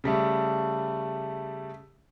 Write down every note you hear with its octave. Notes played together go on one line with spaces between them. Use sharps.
C#3 G3 A3